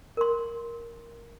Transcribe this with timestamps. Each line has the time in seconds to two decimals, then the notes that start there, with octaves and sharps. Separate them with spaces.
0.17 A#4 C6